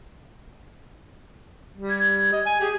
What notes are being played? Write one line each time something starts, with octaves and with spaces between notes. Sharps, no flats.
G3
G#6
D#5
G#5
G4 G#4